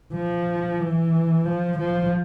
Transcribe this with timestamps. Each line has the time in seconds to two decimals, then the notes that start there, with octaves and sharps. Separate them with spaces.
0.13 F3
0.80 E3
1.45 F3
1.78 F3